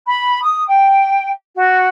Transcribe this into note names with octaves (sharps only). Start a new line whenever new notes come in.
B5
D#6
G5
F#4